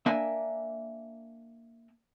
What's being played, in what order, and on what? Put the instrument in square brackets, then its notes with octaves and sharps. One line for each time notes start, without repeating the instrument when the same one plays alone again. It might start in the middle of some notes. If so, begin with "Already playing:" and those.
[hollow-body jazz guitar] A#3 D4 A#4 E5 G#5